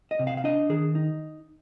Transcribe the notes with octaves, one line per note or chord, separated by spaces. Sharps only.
D#5
C3
F5
F5
D4 D#5
D#3 G#4
D#4